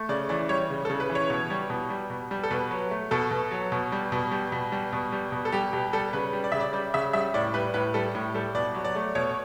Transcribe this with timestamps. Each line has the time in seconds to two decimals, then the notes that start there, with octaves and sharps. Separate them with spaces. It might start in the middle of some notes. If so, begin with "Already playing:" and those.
Already playing: A3
0.09 C#3 D5
0.29 E3 D5
0.49 G3 C#5
0.70 C#3
0.85 A4
0.90 C#3
1.00 B4
1.10 E3
1.15 C#5
1.30 B2
1.50 G3
1.70 B2
1.90 G3
2.10 B2
2.31 G3
2.44 A4
2.51 B2 B4
2.71 F#3
2.91 A3
3.11 B2 A4
3.31 B2
3.51 F#3
3.72 B2
3.92 G3
4.12 B2
4.31 G3
4.52 B2
4.72 G3
4.93 B2
5.12 G3
5.32 B2
5.45 A4
5.52 G3 G4
5.73 B2 G4
5.93 G3 A4
6.13 C#3 B4
6.33 G3
6.44 D5
6.52 C#3 E5
6.60 D5
6.73 G3 D5
6.94 C#3 E5
7.13 G3 E5
7.34 A2 D5
7.54 G3 B4
7.74 A2 B4
7.94 G3 A4
8.15 A2
8.34 G3 A4
8.55 B2 D5
8.75 F#3
8.85 D5
8.95 A3
9.15 B2 C#5
9.29 C#5